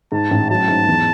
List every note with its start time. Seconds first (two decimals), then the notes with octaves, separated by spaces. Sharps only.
0.12 G#2 A5
0.31 A1
0.50 F#3 A5
0.68 G#2
0.87 E2